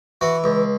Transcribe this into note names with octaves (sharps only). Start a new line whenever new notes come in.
E3 F#4
C#2